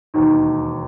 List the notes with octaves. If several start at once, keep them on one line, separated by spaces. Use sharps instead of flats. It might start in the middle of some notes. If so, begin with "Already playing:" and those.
E1 D#2 D#3